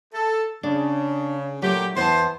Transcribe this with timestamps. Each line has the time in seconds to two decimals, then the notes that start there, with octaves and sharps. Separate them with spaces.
0.14 A4
0.63 C#3 D4
1.62 A#2 F#3 A3 G4
1.96 E2 B3 E4 C5 A5